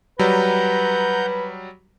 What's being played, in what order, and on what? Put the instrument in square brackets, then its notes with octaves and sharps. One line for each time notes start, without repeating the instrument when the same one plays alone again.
[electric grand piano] F#3 G3 [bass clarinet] B4 [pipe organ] F#5 A#5 G6